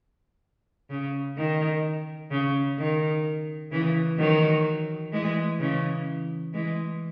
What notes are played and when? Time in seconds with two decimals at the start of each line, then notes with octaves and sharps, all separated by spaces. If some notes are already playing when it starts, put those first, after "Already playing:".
0.90 C#3
1.37 D#3
2.31 C#3
2.78 D#3
3.71 C#3 E3
4.19 D#3 F#3
5.12 E3 G#3
5.60 C#3 E3
6.53 E3 G#3